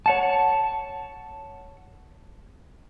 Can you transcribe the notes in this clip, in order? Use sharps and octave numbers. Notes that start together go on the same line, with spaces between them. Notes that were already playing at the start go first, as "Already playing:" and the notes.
C#5 F#5 A5